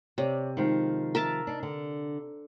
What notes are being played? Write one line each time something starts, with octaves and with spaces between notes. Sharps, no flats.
C3 C#5 D5
D#3 F3 G#3
A#4 E5 A5
D4 D#4
D3